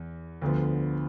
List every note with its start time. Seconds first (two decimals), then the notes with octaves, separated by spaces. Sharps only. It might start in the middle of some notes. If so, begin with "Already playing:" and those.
Already playing: E2
0.42 D2 D3 F3 B3